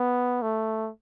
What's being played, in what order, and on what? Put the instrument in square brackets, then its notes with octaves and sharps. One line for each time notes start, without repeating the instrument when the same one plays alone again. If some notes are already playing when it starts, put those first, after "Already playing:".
Already playing: [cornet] B3
A3